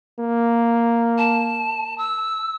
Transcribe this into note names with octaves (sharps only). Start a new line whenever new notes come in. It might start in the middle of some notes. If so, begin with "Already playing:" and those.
A#3
A5
E6